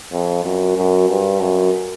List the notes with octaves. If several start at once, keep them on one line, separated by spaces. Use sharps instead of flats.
F2
F#2
F#2
G2
F#2